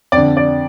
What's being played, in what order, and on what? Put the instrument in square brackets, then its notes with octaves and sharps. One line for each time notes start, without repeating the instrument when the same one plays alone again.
[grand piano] F2 D3 D5
D5